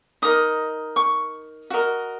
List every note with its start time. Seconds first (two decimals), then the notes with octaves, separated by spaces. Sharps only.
0.22 D#4 A#4 D#5 D#6
0.96 C#6
1.70 F#4 A#4 D#5